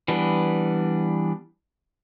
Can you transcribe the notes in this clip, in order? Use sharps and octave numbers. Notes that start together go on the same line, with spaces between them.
E3 G3 B3 D4